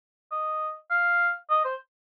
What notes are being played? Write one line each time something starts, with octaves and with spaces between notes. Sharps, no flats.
D#5
F5
D#5
C5